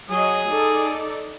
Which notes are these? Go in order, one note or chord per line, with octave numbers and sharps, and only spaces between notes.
F#3 G#4 D#5 D#6
D#4 A4 D5